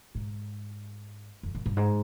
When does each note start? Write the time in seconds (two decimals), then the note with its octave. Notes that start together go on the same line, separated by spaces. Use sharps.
0.15 G#2
1.43 F2
1.55 F#2
1.66 G2
1.77 G#2